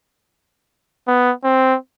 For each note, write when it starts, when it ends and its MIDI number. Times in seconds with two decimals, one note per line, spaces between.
1.08 1.32 59
1.44 1.76 60